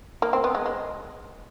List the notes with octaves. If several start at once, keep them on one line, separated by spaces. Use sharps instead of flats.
A#3
C4
B3
G#3
G#3